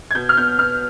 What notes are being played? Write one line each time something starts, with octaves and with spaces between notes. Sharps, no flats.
G#6
B2 G6
F6
B3 G6
B3 F6